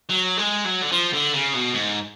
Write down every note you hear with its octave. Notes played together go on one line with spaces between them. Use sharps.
F#3
G#3
F#3
D3
F3
D3
C#3
B2
G#2